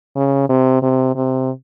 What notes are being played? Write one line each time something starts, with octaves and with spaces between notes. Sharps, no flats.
C#3
C3
C3
C3